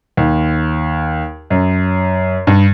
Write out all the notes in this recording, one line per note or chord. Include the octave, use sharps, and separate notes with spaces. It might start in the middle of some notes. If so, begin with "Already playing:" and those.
D#2
F#2
G2